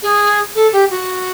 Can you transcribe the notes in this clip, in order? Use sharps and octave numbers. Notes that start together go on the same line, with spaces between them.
G#4
A4
G4
F#4